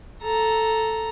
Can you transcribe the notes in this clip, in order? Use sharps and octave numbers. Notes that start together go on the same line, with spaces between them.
A4 A#5